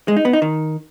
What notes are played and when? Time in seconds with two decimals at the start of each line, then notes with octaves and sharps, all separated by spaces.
0.08 G#3
0.17 D#4
0.25 B3
0.33 D#4
0.42 D#3